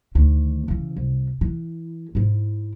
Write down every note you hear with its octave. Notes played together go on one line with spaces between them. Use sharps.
D2 D#3
C#3 E3
C2
E3
G#2 E4